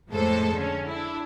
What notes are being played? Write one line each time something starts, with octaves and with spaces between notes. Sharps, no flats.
F2 A2 G#3 A#3 A4 C5
D3 C#4
D4 E4